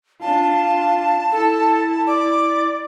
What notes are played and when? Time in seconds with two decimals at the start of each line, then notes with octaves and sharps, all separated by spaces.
0.21 D4 F4 A5
1.32 E4 A4
2.07 D5 D6